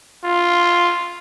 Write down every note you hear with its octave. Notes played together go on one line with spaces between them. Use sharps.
F4